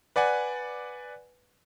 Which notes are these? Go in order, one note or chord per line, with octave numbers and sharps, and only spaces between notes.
B4 D5 F#5 G#5